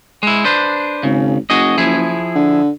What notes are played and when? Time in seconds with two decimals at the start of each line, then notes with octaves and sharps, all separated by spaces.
0.23 G#3 E4
0.45 D4 B4 C5
1.03 G#1 C#3
1.50 F#1 F#4 G#4 D#5
1.78 F3 E4 G#4
2.35 D3